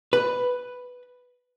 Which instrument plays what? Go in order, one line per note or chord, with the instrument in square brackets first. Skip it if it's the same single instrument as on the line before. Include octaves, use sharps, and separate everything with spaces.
[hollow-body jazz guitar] B4